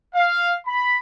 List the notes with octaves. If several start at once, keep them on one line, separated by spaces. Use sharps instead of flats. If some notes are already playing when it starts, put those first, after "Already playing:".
F5
B5